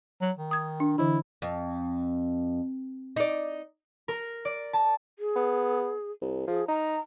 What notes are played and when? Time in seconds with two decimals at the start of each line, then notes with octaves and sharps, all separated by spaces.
0.21 F#3
0.37 D#3
0.51 D#6 G#6
0.80 D4
0.98 D3 E3 E4
1.42 F2
3.16 D#4 D5
4.08 A#4
4.45 D5
4.73 A5
5.19 G#4
5.36 B3
6.22 C2
6.48 F3 G#4
6.68 D#4 A#5